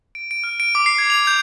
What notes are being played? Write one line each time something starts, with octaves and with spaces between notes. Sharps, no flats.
D7
D7
F6
D7
D6
C7
G#6
F7
G6